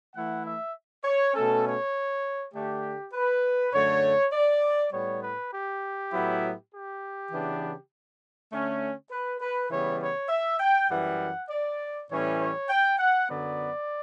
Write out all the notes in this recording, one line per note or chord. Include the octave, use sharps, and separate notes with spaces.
E3 A3 E4 F#5
E5
C#5
B2 A3 C#4 A4
C#5
D3 A3 D4 G4
B4
F#2 D3 A3 C#5
D5
A2 G3 B3 C#5
B4
G4
A2 F#3 B3 E4
G4
C#3 E3 B3 D4
D3 A3 C#4
B4
B4
C#3 E3 G3 B3 C#5
C#5
E5
G5
F#2 E3 G3 F#5
D5
A2 E3 G3 C#4 C#5
C#5
G5
F#5
F#2 D3 F#3 B3 D5